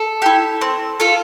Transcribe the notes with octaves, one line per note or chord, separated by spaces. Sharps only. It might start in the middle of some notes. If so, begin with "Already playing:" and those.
Already playing: A4
E4 G4
C4
F4 A4